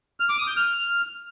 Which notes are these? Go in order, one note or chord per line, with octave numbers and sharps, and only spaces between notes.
F6
D6
D#6
G6
F6